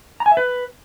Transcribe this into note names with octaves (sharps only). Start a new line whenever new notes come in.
A#5
G#5
E5
B4